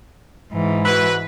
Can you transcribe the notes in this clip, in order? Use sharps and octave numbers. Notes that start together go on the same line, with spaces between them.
G#2 E3
E4 F#4 B4